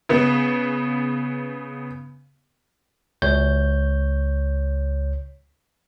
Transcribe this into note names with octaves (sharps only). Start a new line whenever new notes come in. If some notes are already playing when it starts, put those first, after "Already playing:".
C#3 B3
C#2 C#5 G6